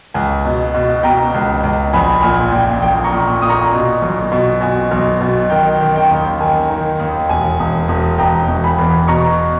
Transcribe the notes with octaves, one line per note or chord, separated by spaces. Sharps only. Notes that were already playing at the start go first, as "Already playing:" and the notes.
C#2 G#5
B2
B2
B2 G5 A#5
C#2
C#2
A#1 G#5 B5
A#2 G#5
A#2 G5
A#1 G5
A#5 C#6
A#2
A#2 D#6
A#5 C#6
B2
B1
B2
B2 G#5
B1
B2
D#3 G5
D#3
G5
D#2
D#3 G#5
D#3
D#2
E1 G#5
E1
E1
E1 G5 A#5
E1
G#5 B5
E2
B2 A#5 C#6